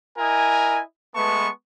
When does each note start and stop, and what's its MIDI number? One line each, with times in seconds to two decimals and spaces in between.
0.18 0.81 64
0.18 0.81 70
0.18 0.81 75
0.18 0.81 80
1.16 1.49 56
1.16 1.49 57
1.16 1.49 59
1.16 1.49 71
1.16 1.49 81
1.16 1.49 85